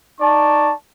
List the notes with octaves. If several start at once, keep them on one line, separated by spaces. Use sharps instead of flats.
D#4 D5 A5 C#6